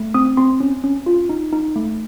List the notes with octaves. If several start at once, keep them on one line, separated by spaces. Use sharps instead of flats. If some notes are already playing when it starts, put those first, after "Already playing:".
Already playing: A3
C4 D#6
C4 C6
C#4
C#4
F4
D#4
D#4
A3